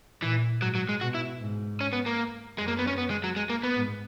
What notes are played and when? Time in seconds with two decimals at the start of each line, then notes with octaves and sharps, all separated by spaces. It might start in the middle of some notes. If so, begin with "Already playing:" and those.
0.22 A#2 E3
0.62 G#2 F#3
0.75 F#3
0.89 G#3
1.01 B2 F#4
1.15 E4
1.40 G#2
1.81 C#4
1.93 B3
2.06 A#3
2.58 F#2 G#3
2.68 A#3
2.79 B3
2.87 C#4
2.98 B3
3.10 G#3
3.24 F#3
3.36 G#3
3.49 A#3
3.63 B3
3.76 G#2